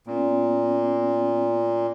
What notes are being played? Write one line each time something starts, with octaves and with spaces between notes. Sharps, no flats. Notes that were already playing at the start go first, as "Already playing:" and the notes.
A#2 B3 C#4